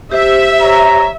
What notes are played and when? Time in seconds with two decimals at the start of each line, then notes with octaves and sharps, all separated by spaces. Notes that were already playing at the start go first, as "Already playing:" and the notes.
0.12 G4 C5 E5
0.61 C#5 A#5